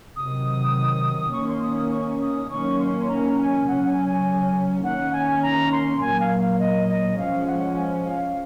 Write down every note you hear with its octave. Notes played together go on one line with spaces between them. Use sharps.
C3 D#3 F#3 D#6
D#3 A#3 C#4 C#6
C6
D#6
D#6
C#6
D#6
D#3 F#3 A#3 C#4 C#6
C6
A#5
G#5
C#3 F#3 C#4 F#5
G#5
G#5
D#3 A#3 C#4 F#5
G#5
A#5
C6
A#2 F#3 A#3 G#5
F5
F5
D#5
D#5
F3 G#3 C#4 F5
F#5
G#5
F5